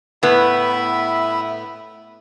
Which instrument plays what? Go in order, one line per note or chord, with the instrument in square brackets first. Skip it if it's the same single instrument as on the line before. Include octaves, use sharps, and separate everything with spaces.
[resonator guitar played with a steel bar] A2 B3 [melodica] E4 E5 B5